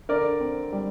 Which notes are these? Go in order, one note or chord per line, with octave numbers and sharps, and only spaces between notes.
D3 A#4 D5
C4
G3